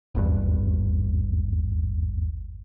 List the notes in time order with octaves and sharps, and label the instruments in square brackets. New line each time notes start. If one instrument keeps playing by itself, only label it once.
[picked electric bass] D#1 G#1 E2 G2